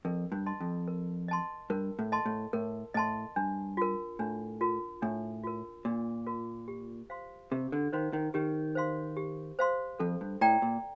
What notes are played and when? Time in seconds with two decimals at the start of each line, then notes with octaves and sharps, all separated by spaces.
0.05 F2 A#4
0.32 G2
0.46 D#5 A5 C6
0.60 F2
0.88 A#4
1.28 D#5 A5 C6
1.70 G2 A#4
1.99 A2
2.12 D#5 A5 C6
2.26 A2
2.53 A2 A#4
2.94 A2 D#5 A5 C6
3.36 G2 D4
3.77 F4 A#4
4.19 A2 D4
4.61 F4 A#4
5.02 A2 D4
5.44 F4 A#4
5.85 A#2 D4
6.26 F4 A#4
6.68 G4
7.10 C5 F5 C6
7.51 C3 G4
7.72 D3
7.92 D#3 C5 F5 C6
8.13 D#3
8.34 D#3 G4
8.75 C5 F5 C6
9.17 G4
9.59 C5 F5 C6
9.99 F2 A4
10.21 G2
10.41 A2 D5 G5 A#5
10.62 A#2